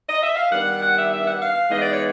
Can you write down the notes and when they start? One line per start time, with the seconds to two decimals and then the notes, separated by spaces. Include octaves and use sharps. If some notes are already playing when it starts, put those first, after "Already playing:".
0.08 D#5
0.22 E5
0.36 F5
0.50 D#3 G3 B3 D4 F#5
0.80 F#5
0.96 E5
1.10 E5
1.25 F#5
1.40 F5
1.70 E3 G#3 B3 D#4 D#5
1.80 D5
1.90 C#5